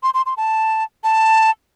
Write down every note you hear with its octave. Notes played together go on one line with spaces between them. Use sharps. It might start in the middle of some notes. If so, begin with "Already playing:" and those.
C6
C6
C6
A5
A5